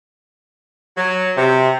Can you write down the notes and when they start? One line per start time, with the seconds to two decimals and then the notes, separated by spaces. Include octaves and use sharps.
0.97 F#3
1.36 C3